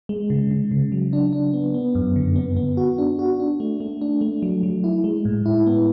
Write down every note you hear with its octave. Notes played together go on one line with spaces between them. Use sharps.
G#3
C#3
C#3
C#3
F#3
D4
D4
B3
B3
F#2
D3
B3
B3
F#4
D4
F#4
D4
A3
A3
D4
A3
F#3
F#3
E4
G#3
A2
E4
B3